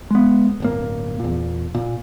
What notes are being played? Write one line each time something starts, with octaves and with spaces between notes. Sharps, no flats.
G#3 B3
D1 G1 A#3
E2 A#2
A#2